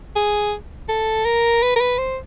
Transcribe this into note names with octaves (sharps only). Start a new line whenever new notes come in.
G#4
A4
A#4
B4
A#4
B4
C5